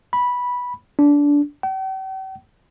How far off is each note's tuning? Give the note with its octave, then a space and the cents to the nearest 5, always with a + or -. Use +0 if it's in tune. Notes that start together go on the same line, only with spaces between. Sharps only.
B5 -10
D4 -20
G5 -45